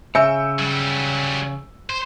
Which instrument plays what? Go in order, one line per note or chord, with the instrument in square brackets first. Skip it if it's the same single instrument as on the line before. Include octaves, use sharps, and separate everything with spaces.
[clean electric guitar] C#3 [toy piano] E5 G#5 [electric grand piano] E6 G6 C#7
[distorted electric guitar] F#3 G3
C5